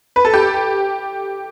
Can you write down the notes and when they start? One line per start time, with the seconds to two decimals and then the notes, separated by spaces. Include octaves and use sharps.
0.16 B4
0.25 A4
0.34 G4